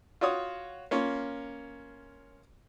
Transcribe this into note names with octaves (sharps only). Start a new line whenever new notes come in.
F4 F#4 C#5 D#6
A#3 C#4 F4